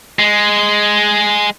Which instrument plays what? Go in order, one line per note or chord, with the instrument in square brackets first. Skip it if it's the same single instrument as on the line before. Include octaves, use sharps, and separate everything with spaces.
[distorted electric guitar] G#3